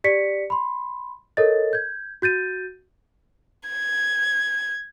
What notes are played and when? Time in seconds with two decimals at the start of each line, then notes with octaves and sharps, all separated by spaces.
0.04 G4 D5 B6 C#7
0.50 B5 C6
1.37 A4 A#4 C#5 D#5 A6
1.73 G6 G#6
2.22 F#4 G6 A6 D#7
3.69 G#6